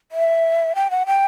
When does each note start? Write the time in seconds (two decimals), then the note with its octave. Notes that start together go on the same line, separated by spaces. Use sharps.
0.12 E5
0.75 G5
0.91 F#5
1.06 G5